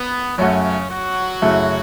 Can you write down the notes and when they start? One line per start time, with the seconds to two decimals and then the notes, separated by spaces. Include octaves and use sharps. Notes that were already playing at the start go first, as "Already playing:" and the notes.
Already playing: B3
0.38 F#2 C#3 F#3 A3 C#4 F#4
0.90 F#3 F#4
1.42 F#2 C#3 A3 C#4 E4